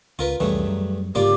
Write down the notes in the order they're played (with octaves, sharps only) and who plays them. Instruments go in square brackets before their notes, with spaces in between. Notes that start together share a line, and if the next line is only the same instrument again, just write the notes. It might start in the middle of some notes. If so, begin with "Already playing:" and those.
[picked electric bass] C#2 [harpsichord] F4 A#4 B4
[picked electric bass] F1 C2 E3 [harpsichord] G2 C#3 A3
[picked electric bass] F#2
[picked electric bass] G1 G#2 C#3 [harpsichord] A#3 F4 D5 [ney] G4